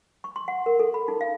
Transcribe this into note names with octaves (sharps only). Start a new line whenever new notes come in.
C#6
C6
F#5
A#4
A4
B5
D#4
F5